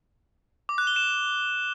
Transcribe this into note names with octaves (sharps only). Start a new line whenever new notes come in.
D6
F#6
G7
E7